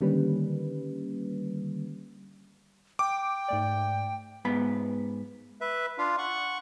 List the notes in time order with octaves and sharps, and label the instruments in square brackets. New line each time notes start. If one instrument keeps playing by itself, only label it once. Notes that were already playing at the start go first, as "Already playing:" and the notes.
[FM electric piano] D3 D#3 G3 A#3 C#4 B4
[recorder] G5 [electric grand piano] D6
[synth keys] G#2 A3 D5
[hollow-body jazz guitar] G#2 B3 B5
[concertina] B4 E5
D4 F4 F5
F#5 C#6